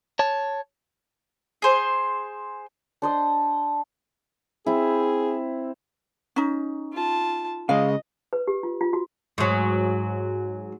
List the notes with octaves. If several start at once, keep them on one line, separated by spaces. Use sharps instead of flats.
C#5 A5
G#4 C5
D4 C5 D#5
C4 E4 G#4
C#4 D#4
F4 A5
C#3 G#3 D#5 F5
B4
G4
F4
F4
F#4
G#2 F#3